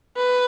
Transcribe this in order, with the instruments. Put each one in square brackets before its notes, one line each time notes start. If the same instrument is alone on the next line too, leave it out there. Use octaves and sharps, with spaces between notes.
[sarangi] B4